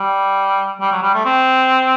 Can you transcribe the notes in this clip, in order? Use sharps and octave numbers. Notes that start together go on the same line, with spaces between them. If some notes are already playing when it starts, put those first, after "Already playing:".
Already playing: G3
G3
F#3
G3
A3
C4